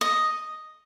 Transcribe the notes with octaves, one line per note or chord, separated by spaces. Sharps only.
D#5